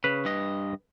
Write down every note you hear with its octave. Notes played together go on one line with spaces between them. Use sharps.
C#3 B4
G2 D#5